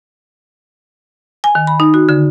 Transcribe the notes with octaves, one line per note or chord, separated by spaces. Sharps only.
G#5
D#3
B5
D#4
F#4
D3